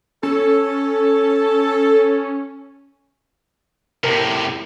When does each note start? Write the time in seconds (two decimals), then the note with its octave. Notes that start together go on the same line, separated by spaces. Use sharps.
0.23 C#4 A4
4.04 A2 C3 A#4